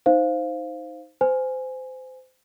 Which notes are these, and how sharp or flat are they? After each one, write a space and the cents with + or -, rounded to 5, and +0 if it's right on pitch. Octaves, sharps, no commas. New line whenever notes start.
D#4 +10 C5 +0 F5 +0
C5 -25 G#5 +0